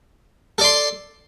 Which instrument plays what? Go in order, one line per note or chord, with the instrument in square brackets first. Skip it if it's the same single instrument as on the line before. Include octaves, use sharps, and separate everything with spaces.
[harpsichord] A4
D5
C6